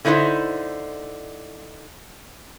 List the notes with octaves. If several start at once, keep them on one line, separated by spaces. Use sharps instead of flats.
D3 D#4 E4 B4 C5